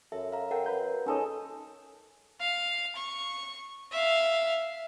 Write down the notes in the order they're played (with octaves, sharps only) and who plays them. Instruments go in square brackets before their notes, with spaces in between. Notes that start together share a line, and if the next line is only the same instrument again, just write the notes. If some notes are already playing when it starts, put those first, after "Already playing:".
[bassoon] F#2 [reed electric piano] A4 [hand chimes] E5
[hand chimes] F5 A#5
[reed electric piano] A4 G5 [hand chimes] A#4 F#5
[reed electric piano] B4 A#5 G6
[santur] G#3 A4 D#5 [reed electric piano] C#4 D#4 C#5
[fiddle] F5
C#6
E5 F5